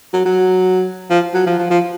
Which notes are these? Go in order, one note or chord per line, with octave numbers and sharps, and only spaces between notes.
F#3
F#3
F3
F#3
F3
F3
F3